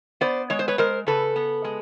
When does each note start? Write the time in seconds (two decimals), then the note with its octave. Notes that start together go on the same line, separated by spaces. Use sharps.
0.21 B3 C5 D5
0.50 G#3 C#5
0.59 C5
0.68 B4 C#5
0.78 G#3 A#4 C5
1.07 C#3 A4 B4
1.36 B3
1.64 G#3